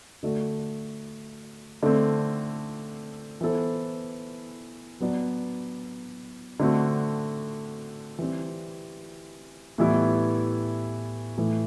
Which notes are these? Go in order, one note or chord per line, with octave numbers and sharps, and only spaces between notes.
D3 A3 D4 F#4
D3 A3 C4
E3 B3 E4 A4 C5
F#3 B3 D4
D3 A3 C4 F#4
E3 G3 C4
A2 E3 G3 B3 E4
A2 E3 A3